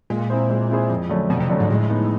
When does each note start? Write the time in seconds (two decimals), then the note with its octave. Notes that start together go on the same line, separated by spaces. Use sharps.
0.10 A#2 G#3
0.30 C4 E4 G#4 C5
0.49 G#3
0.70 C4 E4 G#4 C5
0.90 F2
1.09 D3 F#3 A3 C#4
1.30 F2 B2
1.40 C3
1.49 D3 F#3 A3 C#4
1.60 G#2
1.70 A2 G#3
1.90 B3 D#4